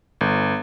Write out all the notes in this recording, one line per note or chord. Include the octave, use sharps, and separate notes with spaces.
G1